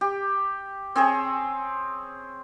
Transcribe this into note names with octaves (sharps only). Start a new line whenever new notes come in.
G4
C4 G#4 C#5